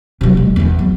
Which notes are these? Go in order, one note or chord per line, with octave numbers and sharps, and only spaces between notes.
C3 F#3
G#3
E2 E3
F#3